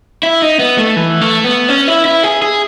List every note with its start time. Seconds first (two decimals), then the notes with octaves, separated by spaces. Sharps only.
0.23 E4
0.42 D#4
0.59 B3
0.78 A3
0.96 E3
1.21 A3
1.44 B3
1.69 C#4
1.88 E4
2.05 E4
2.23 G#4
2.42 G#4